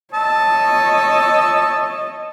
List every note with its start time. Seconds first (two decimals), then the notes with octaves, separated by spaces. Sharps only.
0.14 C#5 D#5 E5 A5